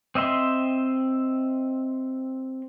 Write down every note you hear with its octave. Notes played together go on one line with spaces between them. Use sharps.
C4 D#5 E5 C6